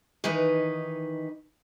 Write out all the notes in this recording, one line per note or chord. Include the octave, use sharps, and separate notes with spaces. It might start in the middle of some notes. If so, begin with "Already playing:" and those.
D#3 E3 D#4 B4